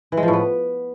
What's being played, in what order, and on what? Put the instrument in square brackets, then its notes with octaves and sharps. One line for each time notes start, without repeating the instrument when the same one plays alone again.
[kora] E3
G#3
F3
A2
B3